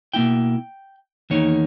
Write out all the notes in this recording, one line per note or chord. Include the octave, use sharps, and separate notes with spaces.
B2 A#3 E4 G5
E2 D#3 A#3 D#4 C#5